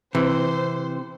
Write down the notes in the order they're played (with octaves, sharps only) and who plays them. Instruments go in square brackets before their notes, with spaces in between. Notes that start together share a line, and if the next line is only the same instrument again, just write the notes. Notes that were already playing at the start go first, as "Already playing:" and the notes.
[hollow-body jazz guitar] C3 [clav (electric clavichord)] E3 [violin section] C5